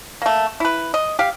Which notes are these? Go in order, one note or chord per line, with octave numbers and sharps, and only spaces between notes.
A3 A#3
E4 B4
D#5
G4 F5